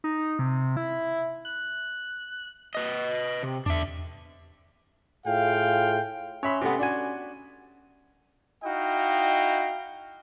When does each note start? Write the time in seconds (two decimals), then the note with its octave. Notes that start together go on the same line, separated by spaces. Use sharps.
0.04 D#4
0.39 C3
0.77 E4
1.45 F#6
2.75 B4 D#5
3.43 C3
3.66 E2 D4 E5
5.26 A2 F4 G#4 F5 G5
6.43 C#4 C#5 E5 B5 C6
6.61 C3 A3 B3
6.79 D4 F#4 G#5
8.63 D#4 E4 F#4 D#5 F5 G5